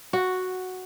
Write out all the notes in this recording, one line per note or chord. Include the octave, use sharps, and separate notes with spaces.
F#4